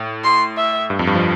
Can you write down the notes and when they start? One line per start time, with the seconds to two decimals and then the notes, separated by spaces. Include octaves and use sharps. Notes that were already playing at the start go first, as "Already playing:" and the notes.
Already playing: A2
0.24 C6
0.57 E5
0.90 G2
0.99 F2
1.07 G2
1.15 F3